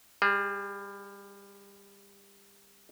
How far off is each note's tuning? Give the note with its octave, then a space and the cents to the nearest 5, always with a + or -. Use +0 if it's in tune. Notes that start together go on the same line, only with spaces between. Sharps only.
G3 +30 G#4 +0